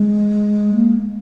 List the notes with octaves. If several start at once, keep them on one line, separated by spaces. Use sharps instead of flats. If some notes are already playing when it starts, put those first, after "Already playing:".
Already playing: G#3
A#3